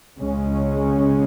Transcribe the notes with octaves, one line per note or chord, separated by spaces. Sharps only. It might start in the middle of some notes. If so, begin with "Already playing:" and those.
C#2 C#3 G#3 C#4